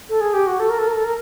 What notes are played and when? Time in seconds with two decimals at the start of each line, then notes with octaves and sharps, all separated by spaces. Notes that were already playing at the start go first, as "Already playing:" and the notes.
0.09 A4
0.21 G#4
0.33 G4
0.47 F#4
0.59 A4
0.69 A#4
0.79 A4
0.87 A#4
0.95 A4
1.04 A#4